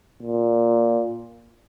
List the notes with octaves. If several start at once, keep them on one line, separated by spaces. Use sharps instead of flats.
A#2